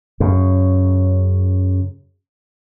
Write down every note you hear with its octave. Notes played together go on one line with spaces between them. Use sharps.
F#2 C#3